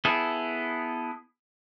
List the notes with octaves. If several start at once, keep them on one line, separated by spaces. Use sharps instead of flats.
B3 E4 G#4 A4